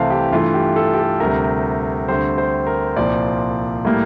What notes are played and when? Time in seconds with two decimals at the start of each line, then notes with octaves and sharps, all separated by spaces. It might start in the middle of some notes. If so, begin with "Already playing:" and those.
Already playing: C2 C3 E3 A3 C4 F5 A5
0.10 G4
0.31 G2 E3 A3 F4
0.54 G4
0.76 A4
0.94 G4
0.98 A4
1.20 D2 C3 G3 A#4
2.08 D2 D3 G3 C4 C5
2.38 C5
2.67 A#4
2.96 C2 A#2 F3 C4 D5
3.85 A2 G3 A#3